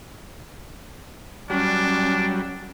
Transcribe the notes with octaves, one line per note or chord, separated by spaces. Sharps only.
F#3 G3 C#4 D4